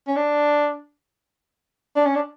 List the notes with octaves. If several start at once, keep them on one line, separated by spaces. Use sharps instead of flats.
C#4
D4
D4
C#4
D4